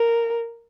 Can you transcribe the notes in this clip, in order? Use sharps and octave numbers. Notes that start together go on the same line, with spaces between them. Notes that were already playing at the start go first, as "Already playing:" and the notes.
Already playing: A#4